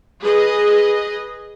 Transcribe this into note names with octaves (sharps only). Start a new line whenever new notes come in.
G#4 B4 D#5